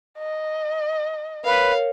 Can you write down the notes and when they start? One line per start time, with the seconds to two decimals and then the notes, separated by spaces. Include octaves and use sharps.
0.18 D#5
1.45 A#4 B4 C#5 F5